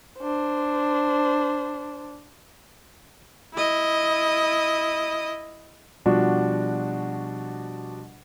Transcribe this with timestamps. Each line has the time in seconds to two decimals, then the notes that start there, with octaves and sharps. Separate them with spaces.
0.19 D4 C5
3.54 E4 D#5
6.06 B2 F3 G3 D4 F#4